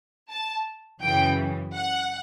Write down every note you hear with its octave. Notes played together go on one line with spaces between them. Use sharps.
A5
F#2 C#3 E3 G5
F#5